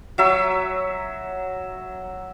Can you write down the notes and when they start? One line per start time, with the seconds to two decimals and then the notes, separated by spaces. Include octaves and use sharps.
0.18 F#3 E5 E6